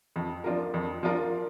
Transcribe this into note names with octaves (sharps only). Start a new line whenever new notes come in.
F2
F3 D4 F4 A#4
F2
F3 D4 F4 A#4